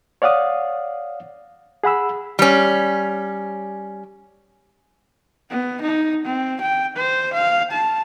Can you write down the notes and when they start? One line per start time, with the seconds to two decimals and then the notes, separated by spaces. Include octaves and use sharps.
0.22 C#5 D5 F5 F#5 D#6
1.84 G#4 F#5 B5 E6
2.39 G3 C#4
5.51 B3
5.81 D#4
6.26 C4
6.61 G5
6.97 C5
7.34 F5
7.71 A5